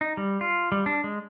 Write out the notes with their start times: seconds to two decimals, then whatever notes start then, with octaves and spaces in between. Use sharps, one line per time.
0.01 D#4
0.17 G3
0.41 F4
0.72 G3
0.86 D4
1.04 G#3